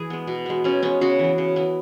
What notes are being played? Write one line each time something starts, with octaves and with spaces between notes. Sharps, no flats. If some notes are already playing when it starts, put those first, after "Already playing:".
Already playing: E3 E4 G#4
G#3 B3
B2
G#3 B3
B2 C#4
G#3 B3 C#4
C#3 F#4
E3 B3
C#3
E3 B3